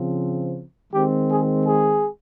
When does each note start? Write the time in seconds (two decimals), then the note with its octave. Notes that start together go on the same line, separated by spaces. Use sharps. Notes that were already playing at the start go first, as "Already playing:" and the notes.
Already playing: C#3 F3 C4
0.93 D#3 G#3 C4 G4
1.29 G#4
1.65 G#4